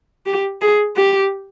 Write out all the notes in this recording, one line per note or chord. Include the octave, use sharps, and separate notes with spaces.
G4
G#4
G4